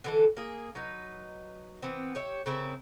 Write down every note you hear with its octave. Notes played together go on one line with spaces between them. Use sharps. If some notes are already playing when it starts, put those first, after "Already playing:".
D3 E3 A4
A#3 G#4
F#3 D#4 B4
E3 B3 C4
G4 C#5 E5
C#3 C4 E4 A#4